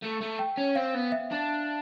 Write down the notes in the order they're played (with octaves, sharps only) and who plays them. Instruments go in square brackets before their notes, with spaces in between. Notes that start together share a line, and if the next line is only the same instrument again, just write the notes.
[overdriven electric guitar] A3
A3
[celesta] G5
[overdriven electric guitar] C#4
[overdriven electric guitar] C4 [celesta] F5
[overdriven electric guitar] B3
[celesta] E5
[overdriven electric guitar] D4